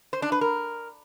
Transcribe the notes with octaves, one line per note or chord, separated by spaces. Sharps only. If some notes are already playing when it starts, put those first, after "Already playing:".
C5
D4
B4
A#4